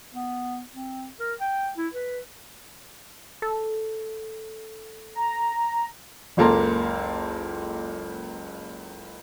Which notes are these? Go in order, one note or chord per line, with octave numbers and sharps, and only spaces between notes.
B3
C4
A#4
G5
E4
B4
A4
A#5
F#1 C#2 A#3 A4 A#5 C6